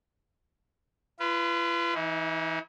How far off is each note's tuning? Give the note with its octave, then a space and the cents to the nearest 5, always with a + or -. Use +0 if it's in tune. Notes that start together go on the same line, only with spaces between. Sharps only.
F4 -40 B4 +0
E3 +0 D#4 +45